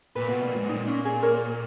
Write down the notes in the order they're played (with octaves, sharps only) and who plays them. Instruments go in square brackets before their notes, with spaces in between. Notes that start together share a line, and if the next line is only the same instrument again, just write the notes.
[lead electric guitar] A#2 [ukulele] B4
[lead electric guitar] B2
A#2
G#2
[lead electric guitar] A#2 [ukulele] D#4
[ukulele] C#4
G#4
A#4 C#5